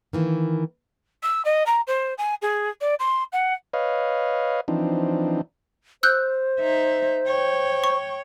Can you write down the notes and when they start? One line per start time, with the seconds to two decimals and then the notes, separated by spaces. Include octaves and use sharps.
0.13 D#3 E3 A#3
1.23 E6
1.45 D#5
1.66 A#5
1.87 C5
2.18 G#5
2.42 G#4
2.81 D5
2.99 C6
3.33 F#5
3.73 B4 C#5 D#5 F5
4.68 E3 F3 C4 D4 D#4
6.03 C5 E6 F#6 G6
6.60 D#4 E5
7.27 C#5 G5
7.84 C#6